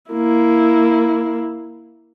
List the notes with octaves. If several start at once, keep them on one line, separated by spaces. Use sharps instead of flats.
A#3 E4